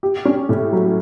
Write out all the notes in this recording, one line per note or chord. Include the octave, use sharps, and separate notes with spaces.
G4
C#4
A2
F#3